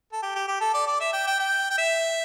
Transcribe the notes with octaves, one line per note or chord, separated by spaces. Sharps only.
A4
G4
G4
G4
A4
D5
D5
E5
G5
G5
G5
G5
E5